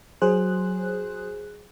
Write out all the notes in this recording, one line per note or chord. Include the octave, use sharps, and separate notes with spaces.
F#3 G#4 C5 F#6